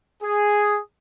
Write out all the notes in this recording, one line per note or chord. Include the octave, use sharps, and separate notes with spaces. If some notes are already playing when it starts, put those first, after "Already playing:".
G#4